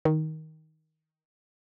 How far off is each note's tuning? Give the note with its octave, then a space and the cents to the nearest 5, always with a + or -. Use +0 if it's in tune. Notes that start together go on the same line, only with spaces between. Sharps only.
D#3 +15